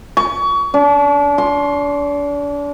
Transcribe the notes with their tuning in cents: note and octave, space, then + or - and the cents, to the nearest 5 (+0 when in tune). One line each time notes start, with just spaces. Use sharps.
C#6 +30
D4 -35
C6 +15